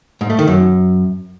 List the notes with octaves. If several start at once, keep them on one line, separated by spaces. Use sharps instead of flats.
G#2
A3
D#3
F#2